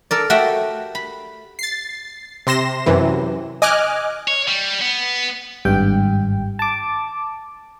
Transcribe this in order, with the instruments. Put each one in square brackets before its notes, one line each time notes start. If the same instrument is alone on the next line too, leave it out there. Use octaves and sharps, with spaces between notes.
[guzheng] A4 A#4 D5
A3 F#4 G4 E5 F#5 G5
B5
[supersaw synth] A6 C7
C3 C6 A#6 E7
F#2 C3 E3
D#5 G#5 D6 F6 F#6
[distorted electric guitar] C#5
G3
B3
[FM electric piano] G#1 G2 G5
A5 D6